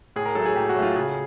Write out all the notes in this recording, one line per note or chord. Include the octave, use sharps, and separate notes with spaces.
A2 G#4
A#4
F#3 A3 A4
G#4
A2 G4
F#4
F#3 A3
F4
C#3 G#4